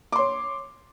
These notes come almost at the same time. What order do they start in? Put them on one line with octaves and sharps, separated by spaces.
D6 C6 C#5